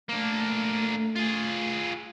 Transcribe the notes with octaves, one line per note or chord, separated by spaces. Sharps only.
A3 A#3 D4
F4 G#4